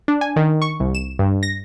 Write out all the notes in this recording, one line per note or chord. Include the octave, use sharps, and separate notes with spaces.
D4
G#5
D#3
C#6
C2
E7
G2
A#6